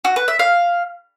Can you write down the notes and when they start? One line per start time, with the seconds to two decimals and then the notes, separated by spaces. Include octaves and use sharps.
0.05 F#4
0.16 B4
0.28 E5
0.39 F5